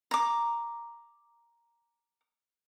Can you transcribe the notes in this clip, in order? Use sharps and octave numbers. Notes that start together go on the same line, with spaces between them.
A#5 D6